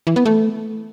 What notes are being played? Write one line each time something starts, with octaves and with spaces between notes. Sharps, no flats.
E3
B3
A3